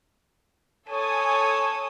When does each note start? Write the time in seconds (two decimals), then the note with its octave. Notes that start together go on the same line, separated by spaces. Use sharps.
0.90 A4 C#5 G#5 D#6